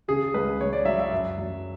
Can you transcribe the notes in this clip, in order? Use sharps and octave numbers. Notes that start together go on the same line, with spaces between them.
C#3 G#4
C#2 B4
C#2 C#5
D5
F#3 E5
E5
F#2
F#3